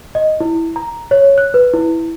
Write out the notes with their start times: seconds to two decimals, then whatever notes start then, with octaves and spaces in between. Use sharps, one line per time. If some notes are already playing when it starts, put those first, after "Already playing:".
0.15 D#5
0.40 E4
0.76 A#5
1.11 C#5
1.38 F#6
1.54 B4
1.74 E4